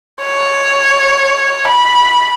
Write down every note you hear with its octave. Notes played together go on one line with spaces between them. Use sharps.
C#5
B5